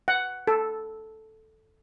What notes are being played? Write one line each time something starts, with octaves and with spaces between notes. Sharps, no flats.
F#5
A4